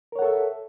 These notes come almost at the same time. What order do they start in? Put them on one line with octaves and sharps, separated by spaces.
A#4 C#5 F#5 A4 E5